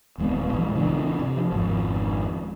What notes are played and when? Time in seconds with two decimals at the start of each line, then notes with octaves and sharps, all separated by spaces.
0.18 D#1 E2 G#3 C4
0.53 A#1 E3
0.75 C#3 E3 A#3 D4
1.19 C3
1.37 F3
1.52 G#1 F2